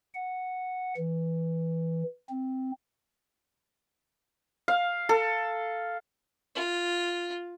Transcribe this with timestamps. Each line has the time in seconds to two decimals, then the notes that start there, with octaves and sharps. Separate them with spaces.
0.15 F#5
0.97 E3
2.29 C4
4.68 F5
5.09 A4
6.55 F4